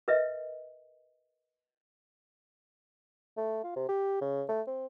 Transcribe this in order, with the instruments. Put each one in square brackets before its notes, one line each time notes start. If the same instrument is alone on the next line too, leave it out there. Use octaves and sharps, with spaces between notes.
[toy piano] A#4 B4 D#5 E5
[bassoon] A3
F4
C3
G4
C#3
A3
C4